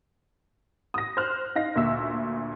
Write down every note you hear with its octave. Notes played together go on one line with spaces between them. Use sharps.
D#6 A#6
C5 F6 F#6
D#4 F5 A#6
D2 A#2 E5 E6